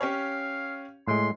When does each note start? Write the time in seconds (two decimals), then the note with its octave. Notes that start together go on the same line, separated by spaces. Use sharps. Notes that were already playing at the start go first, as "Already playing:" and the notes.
0.01 C#4 G4 C#5 F5
1.08 A2 G#3 C6